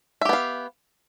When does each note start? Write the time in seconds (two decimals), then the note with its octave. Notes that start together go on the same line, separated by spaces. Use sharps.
0.21 E5
0.25 G4
0.29 B3
0.33 F5